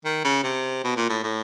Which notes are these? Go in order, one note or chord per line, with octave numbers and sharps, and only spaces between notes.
D#3
C#3
C3
B2
A#2
A2
A2